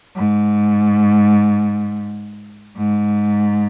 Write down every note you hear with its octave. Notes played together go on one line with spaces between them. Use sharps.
G#2
G#2